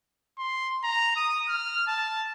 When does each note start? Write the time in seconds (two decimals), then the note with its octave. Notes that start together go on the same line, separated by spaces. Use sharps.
0.38 C6
0.84 A#5
1.16 D#6
1.49 F6
1.87 A5